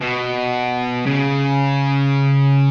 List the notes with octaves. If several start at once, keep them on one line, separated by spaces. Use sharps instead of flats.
B2
C#3